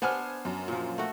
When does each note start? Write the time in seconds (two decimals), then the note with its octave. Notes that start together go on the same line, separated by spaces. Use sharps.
0.02 B3 D4 C5 G#5 F6
0.45 F#2
0.68 A#2 F3
0.98 A3 F#4